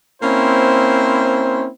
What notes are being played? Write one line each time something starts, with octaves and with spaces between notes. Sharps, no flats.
A#3 C4 C#4 E4 C5